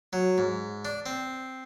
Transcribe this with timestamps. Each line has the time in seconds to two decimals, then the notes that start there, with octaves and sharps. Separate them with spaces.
0.13 F#3
0.38 G#2
0.85 D4
1.06 C4